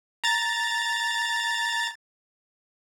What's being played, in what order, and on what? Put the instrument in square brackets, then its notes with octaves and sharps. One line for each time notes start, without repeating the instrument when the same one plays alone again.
[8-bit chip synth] A#5 A6